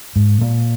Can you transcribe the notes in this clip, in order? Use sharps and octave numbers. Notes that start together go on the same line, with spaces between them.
G#2
A#2